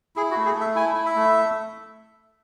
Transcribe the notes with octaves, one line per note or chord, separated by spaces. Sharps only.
E4 G#4
F#4
A3
G#4
A3 E5
E4 G#5
E4
E5
A3